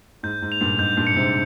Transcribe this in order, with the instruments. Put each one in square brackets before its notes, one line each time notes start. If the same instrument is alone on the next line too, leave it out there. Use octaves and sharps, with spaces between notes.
[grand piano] G#2 [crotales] G6
[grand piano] G#2
[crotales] F7
[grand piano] G2 A#2
[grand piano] G#2 [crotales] G6
[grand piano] G2 A#2
[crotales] C#7
[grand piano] G#2 C3